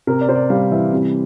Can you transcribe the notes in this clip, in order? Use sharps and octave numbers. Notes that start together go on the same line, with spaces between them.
C3 A#4
D5
C3 C5
D5
G3 F5
E3 E5
C3